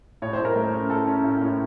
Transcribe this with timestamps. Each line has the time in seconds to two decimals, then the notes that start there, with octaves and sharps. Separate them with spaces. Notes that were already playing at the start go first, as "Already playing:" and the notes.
0.22 A2 C#5
0.33 C5
0.39 A3
0.45 A#4
0.56 A3
0.73 C#4
0.90 A2 A4
1.08 C#4
1.24 A2
1.41 A2